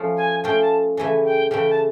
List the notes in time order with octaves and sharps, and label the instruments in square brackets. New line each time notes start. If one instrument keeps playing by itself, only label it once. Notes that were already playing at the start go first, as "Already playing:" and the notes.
Already playing: [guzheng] F3 A3 C#4
[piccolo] G#5
[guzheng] F3 A3 C#4 [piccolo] G5
[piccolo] A5
[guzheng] C#3 E3 A3 [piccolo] G#5
[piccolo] G5
[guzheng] C#3 E3 A3 [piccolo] G5
[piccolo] A5